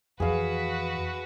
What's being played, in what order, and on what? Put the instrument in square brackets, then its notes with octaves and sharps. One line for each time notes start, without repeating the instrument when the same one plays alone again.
[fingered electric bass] F2 E3 [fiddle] F#4 B4 [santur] G#4 F5